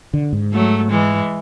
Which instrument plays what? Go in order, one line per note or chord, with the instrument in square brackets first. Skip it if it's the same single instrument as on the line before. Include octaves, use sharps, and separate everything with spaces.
[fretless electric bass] D3
G#2
[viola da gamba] F#3 A3
E3 G#3